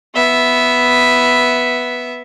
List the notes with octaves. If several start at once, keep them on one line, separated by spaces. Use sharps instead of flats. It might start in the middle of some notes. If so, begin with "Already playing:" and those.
B3 E5